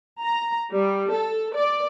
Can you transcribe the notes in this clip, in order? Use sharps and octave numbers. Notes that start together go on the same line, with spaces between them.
A#5
G3
A4
D5